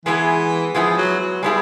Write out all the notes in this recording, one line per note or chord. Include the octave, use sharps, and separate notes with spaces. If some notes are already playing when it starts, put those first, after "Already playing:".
E3 G#3 B3 E4 G#4
F3 G#3 B3 E4 G#4
F#3
F#3
G3 G#3 B3 E4 G#4